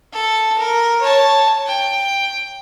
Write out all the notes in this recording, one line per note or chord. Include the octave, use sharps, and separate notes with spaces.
A4
A#4
C#5 A5
G5